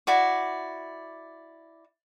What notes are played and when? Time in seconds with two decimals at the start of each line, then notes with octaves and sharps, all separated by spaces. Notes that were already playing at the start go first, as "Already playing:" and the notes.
0.07 E4 F#4 D5